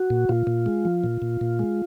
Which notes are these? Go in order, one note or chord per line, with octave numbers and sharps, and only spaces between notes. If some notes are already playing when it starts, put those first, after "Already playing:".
Already playing: F#4
A#2
A#2 F4
A#2
G#3
F3
A#2
A#2
A#2
G#3